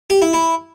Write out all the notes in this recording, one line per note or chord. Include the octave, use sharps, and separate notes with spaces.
G4
E4
E4